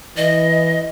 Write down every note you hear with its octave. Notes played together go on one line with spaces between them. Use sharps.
E3 D#5